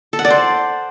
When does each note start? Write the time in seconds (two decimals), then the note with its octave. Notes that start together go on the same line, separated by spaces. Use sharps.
0.13 A4
0.19 F#5
0.25 D5
0.30 C5